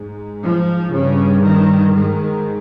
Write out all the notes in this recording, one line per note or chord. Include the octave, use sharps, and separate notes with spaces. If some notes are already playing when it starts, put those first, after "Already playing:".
Already playing: G#2
F3
G2 C#3
D#3
G#2 D#3